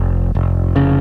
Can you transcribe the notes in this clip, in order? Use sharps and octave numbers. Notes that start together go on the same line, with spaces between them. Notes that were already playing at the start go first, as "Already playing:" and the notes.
Already playing: F1
F1
C#3